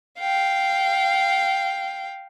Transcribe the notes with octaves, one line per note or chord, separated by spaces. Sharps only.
F5 G5